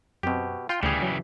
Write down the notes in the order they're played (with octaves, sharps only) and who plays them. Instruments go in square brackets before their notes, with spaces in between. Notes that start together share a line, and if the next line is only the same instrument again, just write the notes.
[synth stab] F#2 C4 [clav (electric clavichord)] B2 G4
[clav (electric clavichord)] F4 [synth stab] G5 C6
[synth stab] D2 [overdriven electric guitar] C#3 E3 [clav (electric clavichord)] G3 G#4
[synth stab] F#3